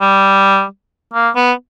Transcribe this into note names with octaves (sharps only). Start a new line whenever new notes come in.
G3
A#3
B3